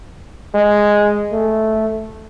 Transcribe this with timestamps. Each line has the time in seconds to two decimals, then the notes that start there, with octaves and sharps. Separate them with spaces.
0.55 G#3
1.32 A3